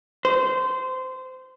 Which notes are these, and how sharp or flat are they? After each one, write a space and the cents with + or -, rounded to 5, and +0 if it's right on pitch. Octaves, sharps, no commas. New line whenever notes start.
C5 -20